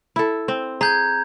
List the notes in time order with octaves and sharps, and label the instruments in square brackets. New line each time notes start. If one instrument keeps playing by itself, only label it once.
[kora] E4 A4
C4
[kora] G#4 [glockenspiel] A#5 G6 G#6